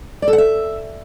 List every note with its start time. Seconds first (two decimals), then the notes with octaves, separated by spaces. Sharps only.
0.22 D5
0.28 A4
0.33 F#5
0.38 E5